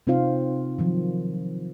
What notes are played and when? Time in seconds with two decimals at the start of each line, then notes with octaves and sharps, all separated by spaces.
0.07 C3 C4 D#4 F4 C5 F5
0.78 D#3 F3 F#3